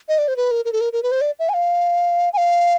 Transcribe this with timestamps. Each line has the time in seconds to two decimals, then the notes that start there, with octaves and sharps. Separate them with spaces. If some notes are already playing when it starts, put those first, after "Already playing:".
0.09 D#5
0.18 D5
0.28 C5
0.37 B4
0.51 A#4
0.65 A#4
0.73 A4
0.81 A#4
0.93 A#4
1.03 B4
1.11 C5
1.21 D5
1.39 E5
1.49 G#5
1.54 F5
2.33 G#5
2.37 F5